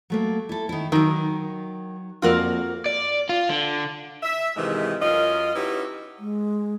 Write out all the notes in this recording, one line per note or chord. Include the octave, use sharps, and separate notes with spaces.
F#3 A3 A#3
E4 A4
D#3 E4
D#3 F#3 A#4
F2 A#3 F4 F#4 A#4 D5
D5
F4
D3
E5
F2 G#2 C3 D#3 E3 G#3
F#2 C#4 F4 A#4 D#5
C#4 D#4 E4 F#4 G4 B4
G#3